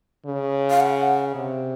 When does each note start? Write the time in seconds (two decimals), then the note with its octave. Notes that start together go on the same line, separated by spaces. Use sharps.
0.26 C#3
0.70 F5
0.80 F#5
1.35 C3